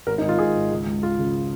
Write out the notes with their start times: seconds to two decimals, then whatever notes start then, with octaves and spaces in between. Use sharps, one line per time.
0.07 G#1 A#4
0.18 D#4
0.23 G#1
0.29 F4
0.38 G#1 G#4
0.55 G#2
0.71 C#2
0.87 C#2
1.02 C#3 F4
1.18 C#3